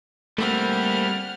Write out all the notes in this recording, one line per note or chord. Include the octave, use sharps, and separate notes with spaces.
G3 A3 A#3 C4 E4 F#5 F6